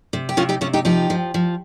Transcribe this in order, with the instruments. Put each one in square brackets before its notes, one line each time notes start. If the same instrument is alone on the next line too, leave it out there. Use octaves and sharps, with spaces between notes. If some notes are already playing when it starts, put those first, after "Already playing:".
[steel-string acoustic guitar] C3
G4
C3 C#4 F4
D#4 G4
C3 C#4 F4
D#4 G4
F3 D#4 G4
F3
F3